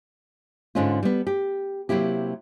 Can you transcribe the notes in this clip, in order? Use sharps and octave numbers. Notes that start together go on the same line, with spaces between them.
G#2 D3 G#3 C#4 D4 F4
G3 B3
G4
C3 F#3 A#3 E4 G4